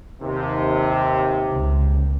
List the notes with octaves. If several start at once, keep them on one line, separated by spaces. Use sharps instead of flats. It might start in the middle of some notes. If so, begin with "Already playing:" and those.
D#2 C3
C#2